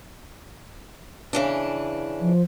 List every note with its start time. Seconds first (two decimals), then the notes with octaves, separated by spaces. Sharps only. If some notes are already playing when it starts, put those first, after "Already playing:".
1.33 C#3 E3 D4
2.21 F3